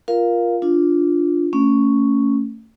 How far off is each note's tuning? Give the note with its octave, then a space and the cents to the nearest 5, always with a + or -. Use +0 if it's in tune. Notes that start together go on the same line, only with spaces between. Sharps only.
F4 +0 A#4 +15 F5 +0
D4 +0 F4 +0
A3 +30 C#4 +0